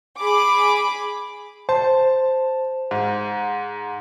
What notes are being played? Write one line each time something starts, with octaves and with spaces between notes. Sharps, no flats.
G#4 B5 D6
C5 A5
G#2